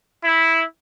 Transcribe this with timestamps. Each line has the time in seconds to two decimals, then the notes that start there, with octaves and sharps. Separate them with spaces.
0.24 E4